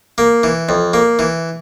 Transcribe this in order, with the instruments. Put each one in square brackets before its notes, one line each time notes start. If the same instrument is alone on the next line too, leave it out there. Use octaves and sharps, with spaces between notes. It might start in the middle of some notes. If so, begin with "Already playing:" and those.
[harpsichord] A#3
E3
F2
A#3
E3